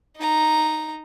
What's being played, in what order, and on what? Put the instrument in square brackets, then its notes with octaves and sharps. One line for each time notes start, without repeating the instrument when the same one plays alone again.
[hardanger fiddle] D#4 A#5